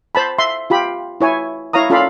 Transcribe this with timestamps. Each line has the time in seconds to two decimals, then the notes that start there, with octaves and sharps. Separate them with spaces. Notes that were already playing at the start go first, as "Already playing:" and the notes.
0.15 C5 A5 B5
0.39 E5 C6
0.70 F4 G4 B5
1.21 E4 C#5 G#5
1.73 E4 C#5 F5 A#5 D#6
1.90 C#4 F4 A4 D5 F5 B5